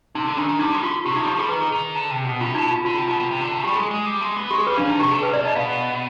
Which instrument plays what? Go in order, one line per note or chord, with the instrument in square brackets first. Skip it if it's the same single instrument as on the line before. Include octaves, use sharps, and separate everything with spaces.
[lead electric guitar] C3 [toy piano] D#4
[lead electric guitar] D3
[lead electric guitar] D#3 [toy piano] D4
[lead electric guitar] D#3
[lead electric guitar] G3 [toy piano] D#4
[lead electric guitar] G#3
[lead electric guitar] D3 [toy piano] F4
[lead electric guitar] C3 [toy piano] G4
[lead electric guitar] D#3 [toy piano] D#4
[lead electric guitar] G3
[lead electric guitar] F3 [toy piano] G4
[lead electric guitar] G3 [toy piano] G#4
[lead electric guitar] F3
[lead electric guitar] D#3 [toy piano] B4
[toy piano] G#4
[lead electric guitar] D#3
D3
C3
B2
[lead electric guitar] C3 [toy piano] F4
[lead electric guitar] B2 [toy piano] D#4
[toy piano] F4
[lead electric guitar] D3 [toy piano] F4
[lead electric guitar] C3
[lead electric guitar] B2 [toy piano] F4
[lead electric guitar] C3
C3
D3
C3
[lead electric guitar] G3 [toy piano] G4
[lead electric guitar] G#3 [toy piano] G#4
[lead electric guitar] G#3
G3
G#3
B3
[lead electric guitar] G#3 [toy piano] G4
[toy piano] G#4
[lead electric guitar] G3 [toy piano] B4
[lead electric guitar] F3 [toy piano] D4
[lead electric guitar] D#3 [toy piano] D#4
[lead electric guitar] C3 [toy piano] G4
[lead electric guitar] D3 [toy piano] G#4
[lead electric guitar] C3 [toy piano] B4
[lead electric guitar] C3 [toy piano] D5
[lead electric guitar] B2 [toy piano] D#5
[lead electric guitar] B2 [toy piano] F5
[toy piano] D#5